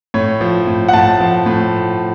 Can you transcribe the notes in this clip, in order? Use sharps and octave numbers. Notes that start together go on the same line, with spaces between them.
A2 C#5
F3
A2
F#5
A2 A5
F3
A2